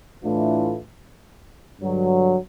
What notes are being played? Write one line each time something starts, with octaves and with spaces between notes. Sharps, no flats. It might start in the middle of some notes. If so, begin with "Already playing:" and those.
A2 E3 A3 D4 F4
G2 D3 F#3